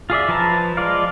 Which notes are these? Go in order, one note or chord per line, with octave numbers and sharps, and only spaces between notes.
F4 G#4 D5 E5
F3 B4 A5 A#5
G#3 F4 D5 F5